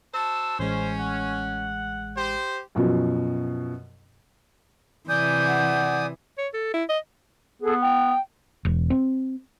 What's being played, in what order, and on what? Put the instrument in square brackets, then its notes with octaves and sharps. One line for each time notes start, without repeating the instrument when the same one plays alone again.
[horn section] F#4 C5 A5 [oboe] E6
[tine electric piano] A1 G#3 [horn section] C#4 [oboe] C5
[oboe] F#5
[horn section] G4 C5
[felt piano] F#2 B2 F3
[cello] C3 E3 [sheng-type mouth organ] D5 G#5 D#6 [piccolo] G6
[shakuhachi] F#5
[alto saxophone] C#5
A4
E4
D#5
[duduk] B3 [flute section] G#4 A4
[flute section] G5
[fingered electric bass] E1
C4